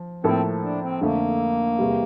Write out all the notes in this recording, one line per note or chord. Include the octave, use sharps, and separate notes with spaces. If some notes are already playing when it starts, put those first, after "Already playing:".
Already playing: F3
A2 F3 A#3 C4 E4 A4
D4
C4
F2 D3 A3 A#3
E2 C3 G3